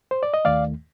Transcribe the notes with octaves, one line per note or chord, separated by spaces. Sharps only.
C5
D5
D#5
D#2 D#3 A3 D5 F5